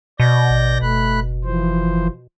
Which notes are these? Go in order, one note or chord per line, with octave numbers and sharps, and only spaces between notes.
B2 D5 G6 A#6
A1
F#1 A3 B5 F#6
E3 F3 C5